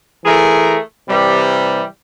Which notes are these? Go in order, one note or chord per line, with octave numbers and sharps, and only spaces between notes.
E3 A3 G#4 A#4
C3 E3 G3